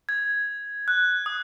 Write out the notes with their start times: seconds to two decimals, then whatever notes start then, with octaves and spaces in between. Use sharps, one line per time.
0.09 G#6
0.88 F#6
1.26 D#6